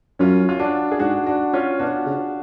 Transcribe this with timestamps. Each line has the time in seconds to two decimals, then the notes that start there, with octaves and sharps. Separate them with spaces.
0.19 F#2 C#4 F4
0.49 F4
0.59 D4 F#4
0.92 G#4
0.99 G#2 D4 F#4
1.27 D4 F#4
1.53 C#4 F4
1.79 B2 D4 F#4
2.06 C#3